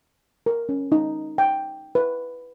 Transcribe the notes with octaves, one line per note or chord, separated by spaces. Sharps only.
A#4
C#4
D#4
G5
B4